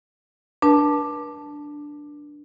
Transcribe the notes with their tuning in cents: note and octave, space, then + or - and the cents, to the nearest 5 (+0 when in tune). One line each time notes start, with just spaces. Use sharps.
D4 +0 B4 -45 A5 +0